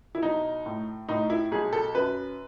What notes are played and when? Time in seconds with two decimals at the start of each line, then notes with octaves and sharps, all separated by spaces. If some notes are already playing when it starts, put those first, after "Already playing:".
0.15 E4
0.22 B1 D#4
0.66 A2
1.09 A2 D#4
1.30 E4
1.52 B1 G#4
1.73 A4
1.95 F#2 B4